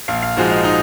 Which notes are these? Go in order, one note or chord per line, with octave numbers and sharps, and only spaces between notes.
A#1 F5
F5
G#2 F3 G#3 F#4
D#4
D#4